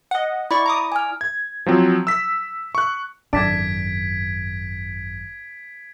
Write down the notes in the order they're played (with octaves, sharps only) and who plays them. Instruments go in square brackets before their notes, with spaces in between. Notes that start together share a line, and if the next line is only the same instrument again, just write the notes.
[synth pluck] D#5 F#5
[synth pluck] E4 D5 C#6 [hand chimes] B5
[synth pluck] A#5 D6 D#6
[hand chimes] G#5 F6
[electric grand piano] G#6
F3 F#3 C4
E6 B6
C#6 F#6
[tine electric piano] G#1 [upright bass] F#2 [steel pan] D4 D5 A5 [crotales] G#6 B6 D7